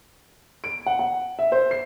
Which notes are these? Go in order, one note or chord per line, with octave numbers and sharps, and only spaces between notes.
D7
F#5
F#5
E5
C5
C7